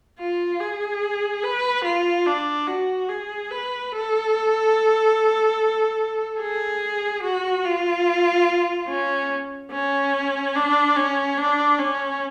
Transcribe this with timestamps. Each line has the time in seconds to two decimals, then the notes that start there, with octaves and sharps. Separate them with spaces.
0.19 F4
0.60 G#4
1.43 B4
1.85 F4
2.26 D4
2.67 F#4
3.09 G#4
3.51 B4
3.92 A4
6.40 G#4
7.23 F#4
7.65 F4
8.89 C#4
9.72 C#4
10.55 D4
10.96 C#4
11.38 D4
11.79 C#4